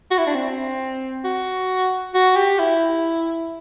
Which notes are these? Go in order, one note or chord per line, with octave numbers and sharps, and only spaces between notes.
F#4
E4
D4
C4
F#4
F#4
G4
E4